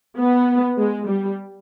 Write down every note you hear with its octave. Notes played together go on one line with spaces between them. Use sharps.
B3
G#3
G3